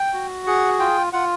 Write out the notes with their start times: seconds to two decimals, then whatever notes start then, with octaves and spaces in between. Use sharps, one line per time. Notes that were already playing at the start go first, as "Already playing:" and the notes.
Already playing: G5
0.13 F#4
0.47 G#4 F#5
0.79 F4 G5
1.13 F4 F#5